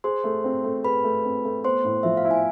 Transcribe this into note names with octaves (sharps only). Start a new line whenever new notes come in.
G#4 C5 C6
A3
C4
A3
G#4 B4 B5
A3
C4
A3
B3 C5 C6
A2
F3 E5
F5
E4
G#5